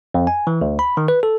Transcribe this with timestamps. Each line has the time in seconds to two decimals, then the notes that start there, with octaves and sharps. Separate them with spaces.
0.14 F2
0.27 G#5
0.47 E3
0.61 D2
0.79 B5
0.97 D#3
1.08 B4
1.23 A4